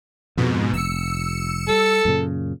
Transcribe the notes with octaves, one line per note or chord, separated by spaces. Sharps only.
F2 G#2 B2
F1 E6 C#7
G3 A4
F#2 A#2 C#3